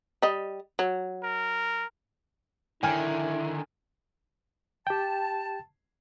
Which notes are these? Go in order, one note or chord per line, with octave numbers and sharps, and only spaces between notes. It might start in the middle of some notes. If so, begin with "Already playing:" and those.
G3 D#5
F#3
A#4
D3 D#3 E4 G5 G#5 F6
G4 G5 A5